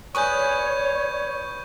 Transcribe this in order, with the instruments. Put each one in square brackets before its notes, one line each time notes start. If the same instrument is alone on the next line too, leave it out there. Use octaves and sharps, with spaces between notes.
[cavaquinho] G#4 B4 D#6 [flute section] C#5 [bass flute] D5 [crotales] C#6 G6